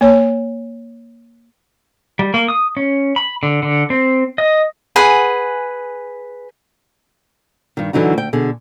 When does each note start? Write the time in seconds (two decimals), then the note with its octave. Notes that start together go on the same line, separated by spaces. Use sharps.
0.01 A#3 C#5
2.19 G3
2.34 A#3
2.48 D#6
2.77 C#4
3.16 B5
3.43 D3
3.63 D3
3.90 C4
4.38 D#5
4.96 G#4 B4 F#5 G#5
7.77 G2 D#3
7.93 D3 E3 F#3 D#4 F#4
8.13 D2 G5
8.33 B2 D3 G#4